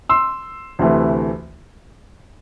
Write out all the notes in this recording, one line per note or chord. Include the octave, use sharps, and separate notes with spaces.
C6 E6
D2 C3 E3 A3